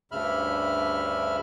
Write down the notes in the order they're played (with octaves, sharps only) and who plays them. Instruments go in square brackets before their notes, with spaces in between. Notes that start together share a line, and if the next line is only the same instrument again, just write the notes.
[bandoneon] D2 G2 C#3 E5 B5 F6